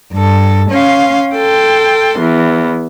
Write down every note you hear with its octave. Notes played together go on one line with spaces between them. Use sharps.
G2 A4
C#4 F5 C6
A4 G5 C6
E2 E3